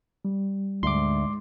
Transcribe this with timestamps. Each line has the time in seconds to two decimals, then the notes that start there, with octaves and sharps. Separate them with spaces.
0.25 G3
0.83 D2 G#2 C6 D6